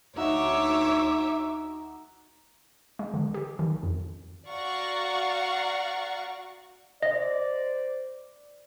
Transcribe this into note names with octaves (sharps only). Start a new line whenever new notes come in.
D2 D#4 F#4 C#5 E5 D6
G#3
D3
G4
D#3
F2
F#4 D5 F5 F#5 A#5 C#6
C5 D5 D#5